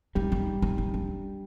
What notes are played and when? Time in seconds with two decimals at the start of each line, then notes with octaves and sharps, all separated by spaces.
0.15 G3 D#4
0.32 D#4
0.62 D#4
0.78 D#4
0.94 D4